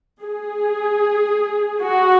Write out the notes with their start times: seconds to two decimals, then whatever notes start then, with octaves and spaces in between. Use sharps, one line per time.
0.22 G#4
1.82 F#4